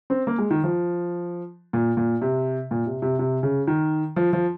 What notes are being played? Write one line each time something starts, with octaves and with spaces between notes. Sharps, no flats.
C4
A#3
G#3
D#3
F3
A#2
A#2
C3
A#2
C3
C3
C3
C#3
D#3
F3
F3